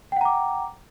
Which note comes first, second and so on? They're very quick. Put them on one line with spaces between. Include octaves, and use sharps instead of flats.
G5 F#5 A#5 D6